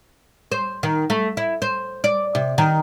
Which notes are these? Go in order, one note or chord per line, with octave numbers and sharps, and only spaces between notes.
C5
D#3
A3
E4
C5
D5
C3
D#3